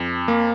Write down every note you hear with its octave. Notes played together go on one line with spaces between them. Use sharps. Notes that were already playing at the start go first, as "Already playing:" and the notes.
Already playing: F2
A#3